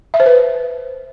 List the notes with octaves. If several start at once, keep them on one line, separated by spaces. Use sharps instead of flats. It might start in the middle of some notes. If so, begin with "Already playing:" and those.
E5
C5
B4